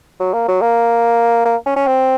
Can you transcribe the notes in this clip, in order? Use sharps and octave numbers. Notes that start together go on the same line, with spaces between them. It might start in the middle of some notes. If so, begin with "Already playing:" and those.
F#3
A#3
F#3
A#3
A#3
C#4
C#4
C4